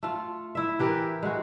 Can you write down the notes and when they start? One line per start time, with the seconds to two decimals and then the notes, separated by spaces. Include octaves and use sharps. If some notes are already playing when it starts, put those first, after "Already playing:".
0.03 A3 F4
0.55 E4 E5
0.79 E3 G4 A#4 B4
1.23 G#3 F#4